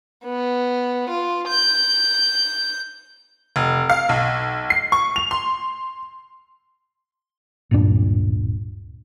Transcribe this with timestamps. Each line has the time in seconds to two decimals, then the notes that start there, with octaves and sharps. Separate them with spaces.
0.25 B3
1.10 F4
1.48 G6
3.56 F1
3.90 F5
4.09 B1
4.70 C7
4.92 C#6
5.16 F7
5.31 C6
7.71 D1 G2 A#2 D4